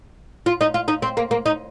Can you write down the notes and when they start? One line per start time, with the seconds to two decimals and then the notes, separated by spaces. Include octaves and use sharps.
0.46 F4
0.61 D#4
0.74 F4
0.88 D#4
1.02 C4
1.17 A#3
1.31 A#3
1.46 D#4